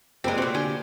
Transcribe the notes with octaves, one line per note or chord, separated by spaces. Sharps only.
F#1 A#2 G#3 C4 G4 B4
A2 C3 F#4 G4 C5
D3 G4 G#5